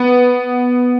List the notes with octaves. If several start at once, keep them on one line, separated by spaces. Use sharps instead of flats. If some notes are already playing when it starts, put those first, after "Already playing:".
Already playing: B3